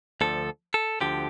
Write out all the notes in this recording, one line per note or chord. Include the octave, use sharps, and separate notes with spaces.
D2 D3 F3 A4
A4
D2 D3 F3 G4